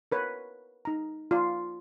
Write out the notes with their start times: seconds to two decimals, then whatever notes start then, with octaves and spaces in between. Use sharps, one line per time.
0.12 A#4 B4 C#5
0.85 D#4 A#5
1.31 F4 D5